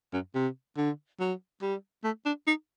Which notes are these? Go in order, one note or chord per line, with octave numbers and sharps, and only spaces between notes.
F#2
C3
D3
F#3
G3
A3
D4
D#4